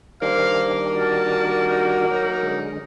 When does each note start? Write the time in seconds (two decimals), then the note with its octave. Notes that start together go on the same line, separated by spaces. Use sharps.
0.22 D#3 G3 A#3 D4 C5 F5
0.94 F#4 A5
1.68 D#4
2.10 F#3 D#4
2.43 D3 G#3